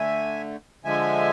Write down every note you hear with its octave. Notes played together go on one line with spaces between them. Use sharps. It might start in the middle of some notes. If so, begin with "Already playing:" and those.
Already playing: D3 A3 E5 G#5
D3 F3 G#3 E5 G#5